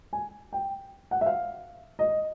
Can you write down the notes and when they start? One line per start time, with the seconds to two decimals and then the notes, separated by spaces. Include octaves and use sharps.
0.13 G#5
0.53 G5
1.11 F#5
1.21 E5
1.26 F5
1.99 D#5